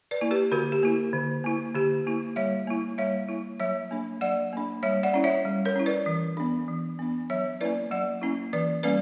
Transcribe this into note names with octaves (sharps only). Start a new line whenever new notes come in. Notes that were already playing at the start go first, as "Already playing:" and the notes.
B4 D5
A#3 E4
G4 B4
D3 F#4 A#4
G4
A#3 E4
D3
A#3 E4
D3 G4
A#3 E4
G3 C#5 E5
A#3 E4
G3 C#5 E5
A#3 E4
F#3 C#5 E5
A#3 D4
F#3 D5 F#5
A#3 D4
G3 C#5 E5
D5 F#5
C#4 E4
C#5 E5
G3
A#4 C#5
C#4 E4
B4 D5
E3
B3 D4
E3
B3 D4
F#3 C#5 E5
A#3 C#4 E4 B4 D5
F#3 D5 F#5
A#3 C#4 E4
E3 B4 D5
G3 A#3 C#4 B4 D5